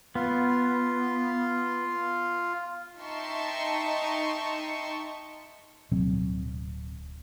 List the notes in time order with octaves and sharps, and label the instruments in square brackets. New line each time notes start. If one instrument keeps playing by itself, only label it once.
[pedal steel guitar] B3 [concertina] F4
[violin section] D#4 E5 G5 A5 C6 C#6
[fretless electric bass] D1 B2 F#3 C4